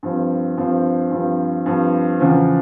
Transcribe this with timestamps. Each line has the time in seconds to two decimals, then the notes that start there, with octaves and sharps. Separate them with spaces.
0.03 G2 F3 C4
0.57 G2 F3 C4
1.11 G2 F3 C4
1.66 G2 F3 C4
2.20 E2 C#3 F3